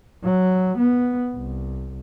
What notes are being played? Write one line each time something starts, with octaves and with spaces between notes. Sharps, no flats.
F#3
B3
C2